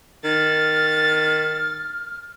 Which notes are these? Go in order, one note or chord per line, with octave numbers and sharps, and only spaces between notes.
D#3 F6 A6